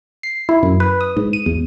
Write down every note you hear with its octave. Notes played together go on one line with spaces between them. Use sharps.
C7
E4
F#2
B4
D#6
G#2
D#7
E2